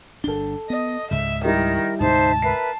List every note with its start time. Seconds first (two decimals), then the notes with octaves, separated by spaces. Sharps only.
0.24 G1 D4 A4 G7
0.70 B3 D#5
1.11 C#2 G#2 C#3 E5
1.45 D#3 G3 E4 A#4
2.00 D2 G#2 C3 D#4 C5 E5 A5
2.42 A#4 B4 E5 C7